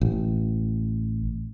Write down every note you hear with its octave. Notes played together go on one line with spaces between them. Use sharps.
A1